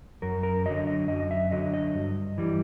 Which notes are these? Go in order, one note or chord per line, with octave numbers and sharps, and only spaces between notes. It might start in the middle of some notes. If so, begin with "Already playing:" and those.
F#2 A#4
A#4
D3 F#3 D#5
D#5
F#2 D#5
E5
D3 F#3 D#5
D#5
G2
E3 G3